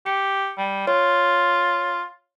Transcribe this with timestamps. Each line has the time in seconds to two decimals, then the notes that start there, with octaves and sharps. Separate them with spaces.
0.06 G4 C#7
0.58 G3
0.87 F4 C#5